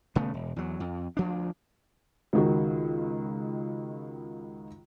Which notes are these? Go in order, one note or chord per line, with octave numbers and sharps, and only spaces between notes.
D#1 C#3 A3 B3
E1
E2 F#3
F2
D2 F3 D4
C#2 D#3 F#4